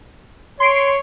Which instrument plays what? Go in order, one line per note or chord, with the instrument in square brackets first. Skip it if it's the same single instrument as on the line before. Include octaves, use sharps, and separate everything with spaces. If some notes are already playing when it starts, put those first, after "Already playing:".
[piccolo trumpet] C#5 [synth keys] C6 C7 D7